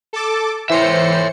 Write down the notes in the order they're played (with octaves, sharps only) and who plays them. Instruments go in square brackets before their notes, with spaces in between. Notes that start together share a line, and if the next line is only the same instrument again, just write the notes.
[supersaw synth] A4 A5 D6
[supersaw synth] E3 C5 C#7 [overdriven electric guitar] C#5 E5